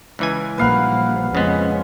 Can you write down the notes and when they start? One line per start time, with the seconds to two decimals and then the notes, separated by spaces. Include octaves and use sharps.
0.19 C#2 E3 G#5
0.58 A#1 G3 A#3 B4 F5 F#5
1.35 F2 C#3 G#3 B3 C#4